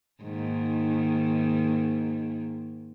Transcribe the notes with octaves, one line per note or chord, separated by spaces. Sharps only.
G#2 D#3 A#3